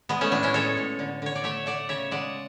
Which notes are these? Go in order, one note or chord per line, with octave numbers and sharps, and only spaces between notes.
G#3 B3
A3 C#4
A2 B3 D4
C#4 E4
G#3 A4 C#5
A2
D3
D3 C#5
D5
A3 C#5 E5
A3 D5 F#5
C#3 C#5 E5
G#3 D5 F#5